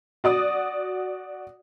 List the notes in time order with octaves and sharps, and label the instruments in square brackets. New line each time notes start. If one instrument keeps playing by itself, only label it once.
[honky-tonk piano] F#4 D5 D#6